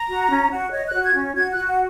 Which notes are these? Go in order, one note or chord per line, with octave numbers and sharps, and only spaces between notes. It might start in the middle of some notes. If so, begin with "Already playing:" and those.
Already playing: A#5
F#4
C#4
F#4
C#5 D#5
F#6
F#4
G#6
C#4
F#4 G#6
F#4 F#6
F#5